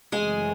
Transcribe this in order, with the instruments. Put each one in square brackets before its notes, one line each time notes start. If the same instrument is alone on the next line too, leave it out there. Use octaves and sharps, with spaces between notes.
[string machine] F#2 C#3 E3 A3 C4 [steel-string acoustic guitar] G#3 G#4